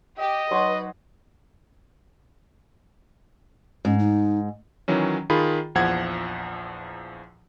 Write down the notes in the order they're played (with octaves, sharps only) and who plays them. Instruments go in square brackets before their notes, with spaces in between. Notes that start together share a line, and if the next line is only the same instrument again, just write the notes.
[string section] G4 [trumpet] D#5
[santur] F#3 D#4 C5 [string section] B4
[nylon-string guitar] G#2 [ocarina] C#4
[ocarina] D#4
[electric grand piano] D#3 E3 F#3 C#4
D#3 F4 G#4 B5
A#1 E2 F3 F#5 G#6